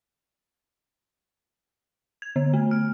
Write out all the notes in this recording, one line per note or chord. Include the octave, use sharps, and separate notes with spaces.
G#6
D3
A3
F6